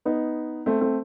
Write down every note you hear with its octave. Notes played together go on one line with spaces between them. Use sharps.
B3 D#4
A3 C4
A3 C4